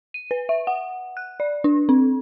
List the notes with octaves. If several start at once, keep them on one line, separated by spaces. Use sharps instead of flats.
D#7
B4
E5
F#5
F#6
D5
D4
C4